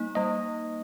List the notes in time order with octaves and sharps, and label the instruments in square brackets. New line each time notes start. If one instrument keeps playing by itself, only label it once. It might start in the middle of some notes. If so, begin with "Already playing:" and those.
Already playing: [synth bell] G3 A#3 D#4
[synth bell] G3 [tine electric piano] D#5